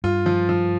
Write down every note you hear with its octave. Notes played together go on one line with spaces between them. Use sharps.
G2 F4
F3
F3